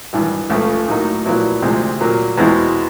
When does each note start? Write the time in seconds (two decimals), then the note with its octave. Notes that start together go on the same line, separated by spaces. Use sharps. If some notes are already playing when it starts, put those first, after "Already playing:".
0.13 G#1 G2 E3
0.50 C#2 C#3 F3 A3
0.88 A2 F#3 A#3 D#4
1.25 A#1 A#2 F#3 B3 E4
1.62 D2 C3 F3 G#3 C4
2.01 A#2 F#3 A#3
2.38 E2 B2 G#3 C4 E4